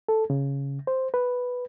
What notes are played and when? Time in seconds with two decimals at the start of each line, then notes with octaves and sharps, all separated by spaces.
0.09 A4
0.30 C#3
0.87 C5
1.14 B4